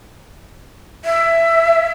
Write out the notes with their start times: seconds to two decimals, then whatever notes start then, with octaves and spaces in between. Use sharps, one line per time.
1.05 E5